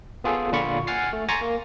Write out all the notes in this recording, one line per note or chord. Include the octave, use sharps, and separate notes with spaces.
B3 F4 G#4 A4
A#2 D3 F4 B5 C#6
F#5 G#5 F6 A6 C7
A3
G#5 A#5 C6 C#6 A6 A#6
A#3